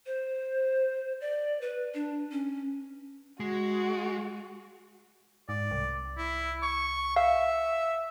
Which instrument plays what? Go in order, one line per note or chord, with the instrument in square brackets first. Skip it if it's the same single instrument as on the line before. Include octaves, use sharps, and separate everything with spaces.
[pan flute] C5
D5
B4
D4
C#4
[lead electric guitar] G#3 [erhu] F#4
[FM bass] G#2 [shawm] D5
[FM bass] C2
[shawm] E4
C#6
[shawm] E5 [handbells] F5